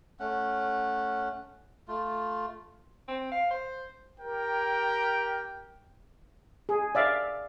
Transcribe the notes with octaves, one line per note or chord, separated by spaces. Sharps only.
A3 C#4 F#5
A3 F4
C4
F5
C5
G4 A#4 G5
G#4
D5 E5 F5